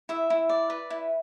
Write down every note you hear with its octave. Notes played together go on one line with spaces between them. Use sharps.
E4 E5
E4
D5
B4
E4